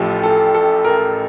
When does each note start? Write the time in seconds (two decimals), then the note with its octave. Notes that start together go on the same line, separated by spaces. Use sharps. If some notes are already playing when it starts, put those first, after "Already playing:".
Already playing: A1 A2 F3 G4 A4
0.23 A4
0.54 A4
0.84 A#4